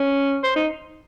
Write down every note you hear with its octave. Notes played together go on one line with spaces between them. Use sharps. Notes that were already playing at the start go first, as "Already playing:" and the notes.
Already playing: C#4
C5
D#4